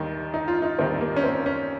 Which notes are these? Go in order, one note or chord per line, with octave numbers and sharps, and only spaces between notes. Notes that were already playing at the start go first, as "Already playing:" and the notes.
Already playing: D#2 D#3 G3 D#4
D#4
F4
D#4
D#2 D#3 G3 C4
A#3
C#4
C4
C#4